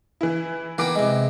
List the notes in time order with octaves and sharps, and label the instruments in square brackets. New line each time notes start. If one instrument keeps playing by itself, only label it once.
[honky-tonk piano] E3 E4
[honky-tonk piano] E3 D6 D7 [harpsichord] A#3 B3 G5
[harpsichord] C3 G#3